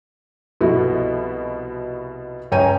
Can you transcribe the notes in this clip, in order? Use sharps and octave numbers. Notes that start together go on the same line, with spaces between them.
C2 B2 F3 E4 F#4 A4
C#2 C#5 G5 G#5 A#5 D#7